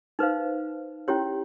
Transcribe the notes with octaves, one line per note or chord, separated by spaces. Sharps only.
D#4 B4 C5 F5
C#4 E4 G4 C#5